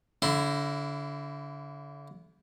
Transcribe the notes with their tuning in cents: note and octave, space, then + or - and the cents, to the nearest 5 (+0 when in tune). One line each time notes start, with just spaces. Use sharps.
D3 -35 E4 +15 C6 -30